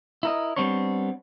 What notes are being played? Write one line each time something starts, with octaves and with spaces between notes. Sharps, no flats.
E4 A#4 D#5
G3 B3 C4 D4 C#5